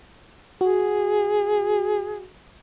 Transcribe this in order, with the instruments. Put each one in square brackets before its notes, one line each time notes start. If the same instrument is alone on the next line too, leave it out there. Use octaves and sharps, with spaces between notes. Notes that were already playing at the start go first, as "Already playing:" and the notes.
[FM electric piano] F#4 [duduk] G#4